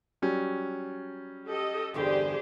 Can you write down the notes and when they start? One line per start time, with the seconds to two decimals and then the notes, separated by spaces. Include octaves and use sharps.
0.22 F#3 G3 C#4
1.47 G4 A4 D#5
1.94 E2 G2 D3 G4 G#4 C5